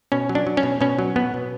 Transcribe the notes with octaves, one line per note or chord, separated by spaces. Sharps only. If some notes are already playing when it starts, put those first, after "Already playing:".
B2 C#4
F#3
D4
F#3
C#4
B2
B2 C#4
F#3
B2 B3
B2